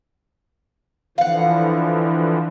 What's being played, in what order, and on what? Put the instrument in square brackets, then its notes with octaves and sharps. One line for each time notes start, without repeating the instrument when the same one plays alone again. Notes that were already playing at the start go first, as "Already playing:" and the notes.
[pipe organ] D3 E3 F3 [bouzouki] F5 F#5